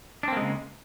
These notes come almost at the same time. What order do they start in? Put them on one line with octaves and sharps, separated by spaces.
D4 C4 A#3 G#3 C#3